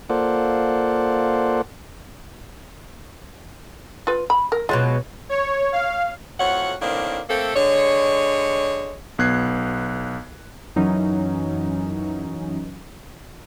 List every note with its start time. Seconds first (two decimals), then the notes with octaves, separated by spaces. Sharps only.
0.10 A#3 F4 A4 C5 D5 F#5
4.07 F4 B4
4.30 B5
4.52 A#4
4.69 B2 F#3 G#3 F4
5.29 C#5
5.72 F5
6.40 F2 A2 F#3 C#5 F#5
6.82 A2 D#3 A#3 C4 D4
7.29 A3 A#3 C4 A4
7.56 D3 G#3 C#5
9.19 B1 B3 F#6 G#6 C7
10.76 F#2 E3 F#3 C#4 D#4